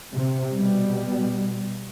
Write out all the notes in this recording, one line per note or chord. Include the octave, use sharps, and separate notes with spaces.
C3
B2 G3